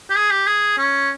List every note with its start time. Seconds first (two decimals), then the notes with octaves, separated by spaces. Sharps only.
0.10 G4
0.16 G#4
0.31 G4
0.47 G#4
0.78 C#4